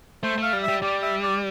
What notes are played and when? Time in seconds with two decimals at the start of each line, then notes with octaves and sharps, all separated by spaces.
0.23 A3 C5
0.38 A3 F5
0.53 G3
0.63 E5
0.68 G3
0.82 G3 D5
1.03 E5
1.23 D5